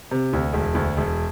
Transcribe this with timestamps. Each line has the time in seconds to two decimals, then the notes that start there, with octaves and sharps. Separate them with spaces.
0.11 C3
0.33 D2
0.53 E1
0.75 D2
0.97 E1